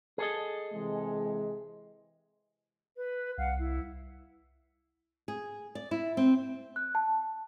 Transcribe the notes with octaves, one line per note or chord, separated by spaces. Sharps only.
G#4 A4 D#5
C3 E3 G#3
B4
C2 F5 F#5
E4
G#4
D5
E4
C4
F#6
A5